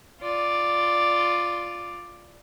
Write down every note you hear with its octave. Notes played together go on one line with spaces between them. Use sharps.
F4 D5